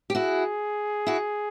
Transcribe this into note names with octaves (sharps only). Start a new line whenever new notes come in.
G4
E4 F#4 G#4
E4 F#4